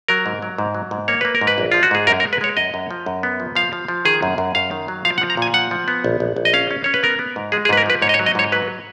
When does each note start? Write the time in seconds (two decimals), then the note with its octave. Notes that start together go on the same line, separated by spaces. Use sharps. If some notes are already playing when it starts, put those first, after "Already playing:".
0.08 F#3 A#4
0.26 G#2
0.42 F#3
0.58 G#2
0.74 F#3
0.91 G#2
1.08 A#3 C#5
1.21 A#3 B4
1.35 A#4
1.41 G#2
1.47 B4
1.58 A#1
1.72 F3 F4
1.83 F#4
1.91 G#2 G#4
2.07 F#2 A#4
2.20 A#4
2.24 G#3
2.33 B4
2.41 G#3 C#5
2.57 F#2 D#5
2.74 F#2
2.91 F3
3.06 F#2
3.23 B3
3.40 F3
3.55 F3 F5
3.73 F3
3.88 F3
4.05 D#3 G#4
4.23 F#2
4.38 F#2
4.55 F#2 F5
4.71 D#3
4.88 F#3
5.05 F3 F5
5.18 F#5
5.21 F3
5.30 A#5
5.37 A#2 G#5
5.54 F3 F#5
5.71 F3
5.88 B3
6.04 A#1
6.20 A#1
6.36 A#1
6.45 D#5
6.53 C#4 F5
6.71 C#4
6.84 C#4 C#5
6.94 B4
7.03 B3 A#4
7.19 B3
7.36 G#2
7.52 G#3 G#4
7.65 G#4
7.69 G#2 B4
7.77 A#4
7.86 F3 B4
8.02 G#2 C#5
8.09 D#5
8.14 C#5
8.19 F#3
8.26 D#5
8.35 G#2 C#5
8.52 F#3 B4